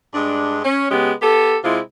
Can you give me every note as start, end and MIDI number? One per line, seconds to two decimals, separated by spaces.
0.14 0.60 43
0.14 0.60 56
0.14 0.60 62
0.65 0.90 61
0.91 1.12 49
0.91 1.12 56
0.91 1.12 59
0.91 1.12 67
1.22 1.57 59
1.22 1.57 67
1.22 1.57 69
1.64 1.79 48
1.64 1.79 56
1.64 1.79 64
1.64 1.79 65